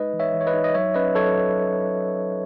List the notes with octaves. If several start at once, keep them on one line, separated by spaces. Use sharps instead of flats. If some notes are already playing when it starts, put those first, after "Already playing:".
Already playing: G#3 D#4 B4 D#5
E3
C#5 E5
E3
C#5
B4 D#5
D#4
D#5
F#3 C#5 E5
C#4 B4 D#5
F#3 A4 C#5